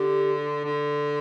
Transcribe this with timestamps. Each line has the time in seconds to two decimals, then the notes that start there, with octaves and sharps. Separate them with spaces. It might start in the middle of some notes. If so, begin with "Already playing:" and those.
Already playing: D3 G4
0.64 D3